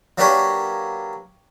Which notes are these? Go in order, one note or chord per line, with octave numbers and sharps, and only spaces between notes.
F#3 A#3 D4 G4 B4 C#5